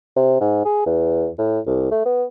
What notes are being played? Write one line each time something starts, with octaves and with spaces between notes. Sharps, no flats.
C3
G#2
G#4
E2
A2
C2
A3
B3